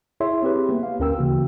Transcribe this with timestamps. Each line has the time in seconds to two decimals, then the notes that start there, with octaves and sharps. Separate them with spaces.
0.20 E4 G#4 C#5 E5 C6
0.43 C4 G4 B4
0.69 A#3 B3
0.83 F5
1.00 D2 C#4 A#4 G5 E6
1.18 C#3 E3 A#3 F#4